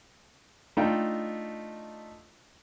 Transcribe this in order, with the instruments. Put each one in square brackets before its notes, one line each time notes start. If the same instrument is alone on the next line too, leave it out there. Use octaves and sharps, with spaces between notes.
[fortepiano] A3 D4 D#4 F4 D#5 G5